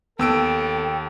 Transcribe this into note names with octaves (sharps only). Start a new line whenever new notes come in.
D#2 B3 A4 G5 E6 D7